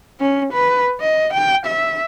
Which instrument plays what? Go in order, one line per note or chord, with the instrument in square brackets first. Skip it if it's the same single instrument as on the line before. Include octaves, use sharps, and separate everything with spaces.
[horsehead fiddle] C#4
B4
D#5
G5
E5